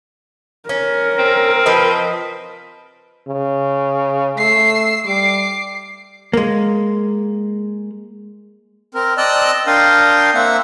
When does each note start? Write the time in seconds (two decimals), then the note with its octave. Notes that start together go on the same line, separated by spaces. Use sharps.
0.69 C#4 A#4
1.19 C4
1.66 F3 B4 D#5
3.27 C#3
4.37 A3 E6 C7
5.06 G3 D6 C7
6.33 G#3 A#3
8.95 C4 A#4
9.18 C4 D5 D#5 A5 E6 F#6
9.67 D4 A#4 F5 G5 C6 D#6
10.34 A#3 C4 E5 F#5